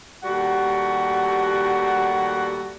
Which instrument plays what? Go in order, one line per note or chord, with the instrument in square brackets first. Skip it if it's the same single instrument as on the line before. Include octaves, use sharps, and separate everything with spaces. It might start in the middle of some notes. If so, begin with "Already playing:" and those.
[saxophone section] D#2 G3 A3 F#4 F#5